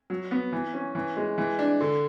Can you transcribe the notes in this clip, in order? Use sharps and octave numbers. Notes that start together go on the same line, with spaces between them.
F#3
B3
E3
C#4
E3
G#3
E3
D4
D3